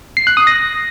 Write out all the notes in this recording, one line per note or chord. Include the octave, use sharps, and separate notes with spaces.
C7
F#6
D#6
A#6